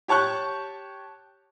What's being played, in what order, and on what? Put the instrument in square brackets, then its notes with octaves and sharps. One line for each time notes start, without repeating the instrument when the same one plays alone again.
[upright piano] G4 C#5 A5 C#6 F#6 G6